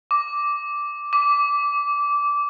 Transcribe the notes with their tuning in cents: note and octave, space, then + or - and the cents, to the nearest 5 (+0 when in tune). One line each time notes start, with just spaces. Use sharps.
D6 -5
D6 -15